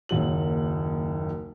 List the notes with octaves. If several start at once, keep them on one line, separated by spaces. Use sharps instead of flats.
F#1 D#2 F#3 F#7